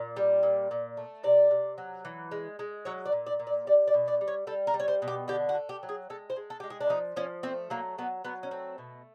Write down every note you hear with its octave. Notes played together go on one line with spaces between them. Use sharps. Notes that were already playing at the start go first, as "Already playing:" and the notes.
Already playing: A#2
G3
A#2
A#2
A3
C3 D5
C3
F#3
E3
G#3
G#3
F#3 C#5
D5
A#2
D5
A#2
D5
G3 D5
D5
B2
D5
G3
C#5
G3 A4
A#4
G3
C#5
C5
B2
G4
D3 G4
F#4
A3
G4
F#3
G#4
G#3 A4
C5
G#3
A4
G#3 G4
G#4
D4
F3 D#4
F3 C#4
A3 C4
F#3 A#3
F#3 B3
F#3 B3
C#4
A3 C4
B2